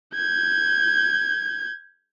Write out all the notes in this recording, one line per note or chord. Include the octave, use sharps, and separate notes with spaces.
G6 G#6